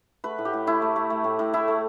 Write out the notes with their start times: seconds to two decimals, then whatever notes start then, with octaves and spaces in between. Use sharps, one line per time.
0.24 A3 B4
0.38 A2
0.45 G4
0.53 A2
0.67 A3 E4
0.82 A3
0.96 A3
1.10 A3
1.24 A2
1.39 A2
1.53 A3 E4
1.68 A3